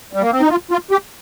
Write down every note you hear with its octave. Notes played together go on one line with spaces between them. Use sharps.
G3
A#3
C4
D#4
F4
F4
G4